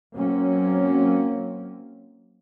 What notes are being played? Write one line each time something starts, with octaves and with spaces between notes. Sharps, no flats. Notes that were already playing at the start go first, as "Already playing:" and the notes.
F#3 A#3 C4 C#4